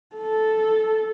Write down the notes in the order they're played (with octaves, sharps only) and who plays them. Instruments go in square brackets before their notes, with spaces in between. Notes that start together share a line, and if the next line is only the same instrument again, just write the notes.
[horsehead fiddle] A4